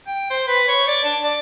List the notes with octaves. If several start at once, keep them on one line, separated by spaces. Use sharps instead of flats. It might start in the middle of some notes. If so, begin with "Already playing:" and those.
G5
C5
B4
C#5
D5
D4
D5